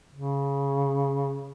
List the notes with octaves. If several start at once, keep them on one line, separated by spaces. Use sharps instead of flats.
C#3